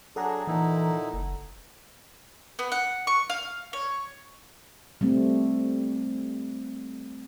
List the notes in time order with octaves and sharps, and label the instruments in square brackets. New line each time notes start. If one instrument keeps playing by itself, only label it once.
[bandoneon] F#3 D4 G#4 [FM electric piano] A4 F#5 A#5
[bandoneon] A#2 D#4 E4 [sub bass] E3
[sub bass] F#1
[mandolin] B3
F#5
C#6
F5
C#5
[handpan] G3 A3 C4